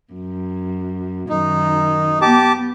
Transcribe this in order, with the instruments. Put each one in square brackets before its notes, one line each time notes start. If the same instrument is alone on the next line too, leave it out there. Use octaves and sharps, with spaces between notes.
[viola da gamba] F#2
[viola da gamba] F#2 D#3 [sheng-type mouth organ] D#4
[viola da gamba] B3 [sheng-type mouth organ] G4 A5 D6